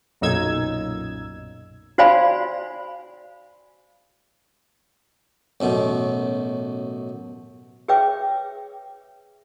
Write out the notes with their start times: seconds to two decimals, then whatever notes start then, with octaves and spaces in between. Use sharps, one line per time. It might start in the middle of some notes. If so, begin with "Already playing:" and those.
0.21 B1 F#2 A#2 D#4 E6 G#6
1.98 F#4 C5 D5 F5 G#5 B5
5.60 A1 F#2 B2
7.88 G#4 B4 C#5 E5 G5 D6